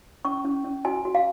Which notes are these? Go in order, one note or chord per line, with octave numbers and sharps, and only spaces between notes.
C#4 C#6
C#4
C#4
F#4 G#5
F#4
F5